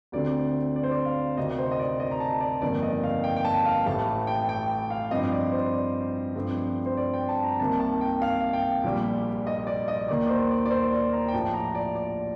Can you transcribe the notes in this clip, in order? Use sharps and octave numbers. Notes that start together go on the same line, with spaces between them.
D2 D3 A3 C4 D5
D5
C5
D5
F5
D2 C3 D#3 D#5
C5
D#5
D5
D#5
A#5
A5
D5
G1 F2 D#3 A#3 D5
D#5
F5
G5
G5
A5
F5
A1 A2 A3 A5
G5
G5
F5
G2 F3 C4 D#5
D5
C5
D5
G2 F3 A3 C4
C5
D5
G5
A5
A#5
C2 C3 D#3 A#3 A5
A5
G5
F5
G5
A#1 A#2 G3
D#5
D5
D#5
D#2 D#3 A#3 D5
C5
D5
D5
C5
D5
A#5
G5
A#1 A2 F3 A5
A#5
D5
D5